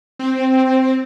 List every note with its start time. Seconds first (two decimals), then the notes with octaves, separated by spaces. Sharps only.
0.19 C4